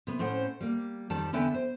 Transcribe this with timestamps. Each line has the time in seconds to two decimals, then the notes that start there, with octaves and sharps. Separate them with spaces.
0.07 C3 B3
0.19 A2 C4 C#4 C5 F#5
0.61 G3 A#3
1.10 F2 D#3 G3 A5
1.33 E2 D3 B3 E5 G5 G#5
1.54 C5